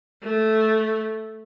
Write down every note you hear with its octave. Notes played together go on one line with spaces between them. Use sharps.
A3